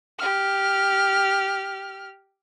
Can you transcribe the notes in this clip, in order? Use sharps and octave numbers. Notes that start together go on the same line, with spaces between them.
G4 F6